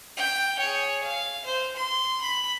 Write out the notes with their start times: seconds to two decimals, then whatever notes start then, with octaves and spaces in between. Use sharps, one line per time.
0.17 G5
0.59 G#4 C#5
1.03 F5
1.45 C5
1.76 C6
2.22 B5